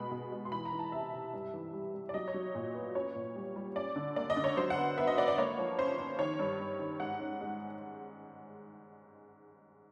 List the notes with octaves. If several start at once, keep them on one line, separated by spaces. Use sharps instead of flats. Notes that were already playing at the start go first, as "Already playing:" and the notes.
Already playing: B2 G#3 B5
B2
G#3
C6
E3 B5
A#5
E3
A5
C3 E5
C3
G2
E3
G3
G3
D5
F#3 D#5
C#5
F#3
A#2
B3
C#4 C#5
A#2
G3
G3
C#4 D5
D3
A#3 D5
D#5
D3
C#5
F#3 C5
F#5
B3
B3 E5
D#5
B3 D5
D5
A#3 C#5
F3
C#4 C5
C#4
D#3 C#5
G2
G2
D#3
G#2 F#5
C#4
G#3